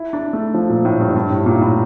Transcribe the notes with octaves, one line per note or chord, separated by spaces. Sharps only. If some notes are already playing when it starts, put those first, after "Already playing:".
Already playing: E4
D4
A3
F3
A#2
A2
G2
G2
A2
A#2
A2